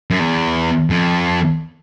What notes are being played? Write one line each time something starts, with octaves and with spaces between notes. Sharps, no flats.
F#2
E2
F2